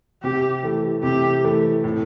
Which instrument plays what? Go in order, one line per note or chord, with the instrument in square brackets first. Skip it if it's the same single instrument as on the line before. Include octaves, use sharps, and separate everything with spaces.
[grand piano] C3 [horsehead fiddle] G4
[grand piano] E3 A3
[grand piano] C3 [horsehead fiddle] G4
[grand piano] E3 A3
A2